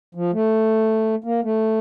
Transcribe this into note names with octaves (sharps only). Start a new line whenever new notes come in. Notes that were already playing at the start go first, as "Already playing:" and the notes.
F3
A3
A#3
A3